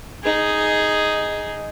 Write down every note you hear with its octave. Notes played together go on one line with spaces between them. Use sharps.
D#4 G#4